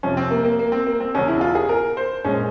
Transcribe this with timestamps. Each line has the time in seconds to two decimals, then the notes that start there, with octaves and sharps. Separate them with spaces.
0.03 F2 C3 F3 C#4
0.17 C4
0.30 A#3
0.45 A#3
0.59 A#3
0.72 C4
0.87 A#3
1.00 C4
1.14 E1 E2 C#3 C#4
1.28 E4
1.41 F4
1.55 G#4
1.69 A#4
1.97 C5
2.24 A#1 A#2 G#3 C#4